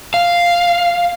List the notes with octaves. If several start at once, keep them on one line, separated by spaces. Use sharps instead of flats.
F5